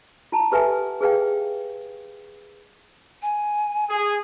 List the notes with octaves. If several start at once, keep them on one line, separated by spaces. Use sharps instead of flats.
F4 A5 A#5
G4 A4 B4 E5 F#5 G#5
G#4 B4 F5 G5
G#5
G#4